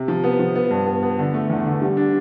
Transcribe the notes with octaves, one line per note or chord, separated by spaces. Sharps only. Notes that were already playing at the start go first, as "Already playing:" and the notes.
Already playing: C3
F3
B3
F3
B3
G2
B3
B3
D3
A3
E2
D3
G3
D4